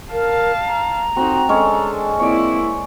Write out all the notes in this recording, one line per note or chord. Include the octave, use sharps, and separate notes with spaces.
A#4 F5 A5
A#5
C4 D#4 F#4 C6
G#3 C#4 D4 A4
A#3 C4 E4 C#5 D5